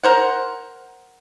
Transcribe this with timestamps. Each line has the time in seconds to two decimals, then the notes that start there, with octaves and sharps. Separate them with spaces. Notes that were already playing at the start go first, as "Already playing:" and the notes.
0.03 A#4 C5 F#5